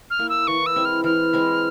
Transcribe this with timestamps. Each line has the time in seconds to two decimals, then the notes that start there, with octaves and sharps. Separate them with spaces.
0.10 F6
0.19 A#3 E4
0.29 E6
0.47 E3 C#6
0.66 E6
0.76 G#3 C4 E4
0.85 F6
1.04 E3 F6
1.33 G#3 C4 E4